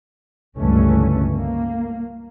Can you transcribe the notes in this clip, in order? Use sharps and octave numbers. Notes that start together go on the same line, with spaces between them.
C#2 G2 D3 E3 A3 C#4
A#3